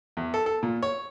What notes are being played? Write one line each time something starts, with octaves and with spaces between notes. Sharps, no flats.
E2
A4
A4
A#2
C#5